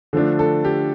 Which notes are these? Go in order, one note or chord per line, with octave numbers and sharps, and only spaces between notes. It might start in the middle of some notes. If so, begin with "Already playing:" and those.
D3 F3 A3 D4
A4
G4